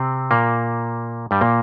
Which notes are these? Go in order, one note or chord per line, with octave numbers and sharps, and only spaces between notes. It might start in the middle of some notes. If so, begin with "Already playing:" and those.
Already playing: C3 C4
A#2 A#3
G2 G3
A#2 A#3